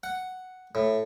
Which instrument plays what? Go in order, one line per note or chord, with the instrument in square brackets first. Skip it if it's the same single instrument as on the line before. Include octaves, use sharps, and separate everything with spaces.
[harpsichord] F#5
A2